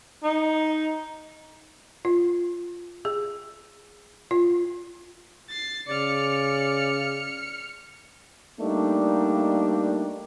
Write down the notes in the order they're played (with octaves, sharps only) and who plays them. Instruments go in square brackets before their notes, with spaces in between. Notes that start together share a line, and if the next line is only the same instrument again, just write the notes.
[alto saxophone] D#4
[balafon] F4
G#4
F4
[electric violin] A6 C7
[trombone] C#3 [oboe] D5 [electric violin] F6 C#7
[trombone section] G3 A3 A#3 D4 D#4